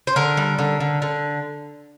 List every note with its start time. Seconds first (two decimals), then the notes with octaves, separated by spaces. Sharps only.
0.07 C5
0.16 D3 A#4
0.37 G3
0.59 D3
0.80 D3
1.02 D3